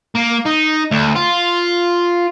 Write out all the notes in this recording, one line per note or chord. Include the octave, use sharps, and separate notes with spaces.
A#3
D#4
D2
F4